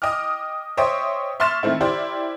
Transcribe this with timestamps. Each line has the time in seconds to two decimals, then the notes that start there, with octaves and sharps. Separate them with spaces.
0.02 D#5 G5 D6 F6
0.77 C5 C#5 D#5 E5 G5
1.40 E5 C6 C#6 F6 A6 E7
1.63 D#3 A3 C4 E4
1.81 E4 G4 C5 D5